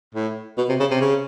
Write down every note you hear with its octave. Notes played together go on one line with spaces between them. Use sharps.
A2
B2
C3
C#3
C3
C#3